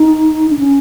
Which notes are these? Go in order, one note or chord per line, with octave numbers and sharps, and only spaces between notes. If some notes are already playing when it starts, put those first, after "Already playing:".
Already playing: D#4
D4
C#4